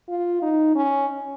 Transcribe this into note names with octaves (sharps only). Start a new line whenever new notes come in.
F4
D#4
C#4